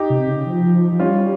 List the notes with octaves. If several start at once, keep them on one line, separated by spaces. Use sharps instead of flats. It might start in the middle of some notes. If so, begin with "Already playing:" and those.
Already playing: D#4 G4
C3
C#3
F3
F3
G3 C#4 F4